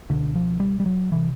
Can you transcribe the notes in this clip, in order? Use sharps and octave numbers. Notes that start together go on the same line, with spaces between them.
C#2 B2 D3
F3
G3
G3
F#3
C3 E3